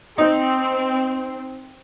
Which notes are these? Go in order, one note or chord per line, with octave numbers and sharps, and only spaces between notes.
C4 D#4